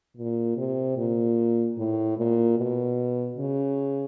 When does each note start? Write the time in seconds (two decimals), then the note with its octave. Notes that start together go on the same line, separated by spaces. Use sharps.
0.17 A#2
0.57 C3
0.97 A#2
1.78 A2
2.18 A#2
2.58 B2
3.38 C#3